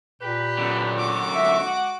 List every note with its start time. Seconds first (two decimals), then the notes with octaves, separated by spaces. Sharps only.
0.22 A#2 G4 B4
0.58 F#2 D3
0.97 F#4 D6
1.35 G#3 E5
1.67 F#5